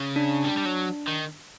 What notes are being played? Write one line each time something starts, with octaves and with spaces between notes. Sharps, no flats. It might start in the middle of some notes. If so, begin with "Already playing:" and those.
Already playing: C#3
D4
G3
G3
F#3
D#3